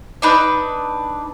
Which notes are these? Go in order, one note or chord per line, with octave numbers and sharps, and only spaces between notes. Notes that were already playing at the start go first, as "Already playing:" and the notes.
D4 D#4 B4